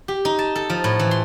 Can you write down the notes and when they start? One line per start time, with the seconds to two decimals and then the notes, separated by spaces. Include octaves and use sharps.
0.08 G4
0.25 D#4
0.39 A5
0.55 A4
0.70 F3
0.84 A2
0.99 E3
1.11 C6